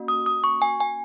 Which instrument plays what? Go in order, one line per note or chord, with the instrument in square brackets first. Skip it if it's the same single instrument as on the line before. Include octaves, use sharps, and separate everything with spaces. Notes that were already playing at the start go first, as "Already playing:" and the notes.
Already playing: [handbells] A#3 C#4 F#4
D#6
D#6
C#6
G#5
G#5